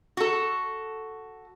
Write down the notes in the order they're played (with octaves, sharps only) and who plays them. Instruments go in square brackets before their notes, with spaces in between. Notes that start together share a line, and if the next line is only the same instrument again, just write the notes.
[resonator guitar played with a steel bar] F#4 A4